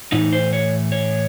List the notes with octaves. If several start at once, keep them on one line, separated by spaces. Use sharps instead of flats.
A2 E3 A3 D#4
C5
C#5
C#5